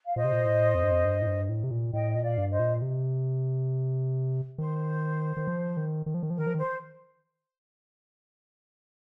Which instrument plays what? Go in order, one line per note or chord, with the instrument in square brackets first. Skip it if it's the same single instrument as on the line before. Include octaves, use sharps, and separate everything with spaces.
[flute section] F5
[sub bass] A#2 [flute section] C5 D#5
[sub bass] C3
A#2
A2
F2
G2
F2
G2
A2
G2
A2
C3
A#2
[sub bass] A2 [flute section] D#5 G5
[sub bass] A#2 [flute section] D#5
[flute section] D5 F5
[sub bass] G2
[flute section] C5 D#5
[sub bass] A#2
C3
[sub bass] D#3 [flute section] C5
[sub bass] D#3
F3
D#3
D#3
F3
D#3
F3
[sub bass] D#3 [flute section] A#4
[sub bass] F3
D#3
[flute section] C5